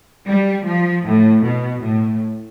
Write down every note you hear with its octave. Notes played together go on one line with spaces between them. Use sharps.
G3
F3
A2
B2
A2